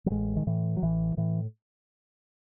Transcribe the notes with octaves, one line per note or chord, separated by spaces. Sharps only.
F#3
A1 G#3
D#3
A2 E3
F#3
A1 E3
A2 E3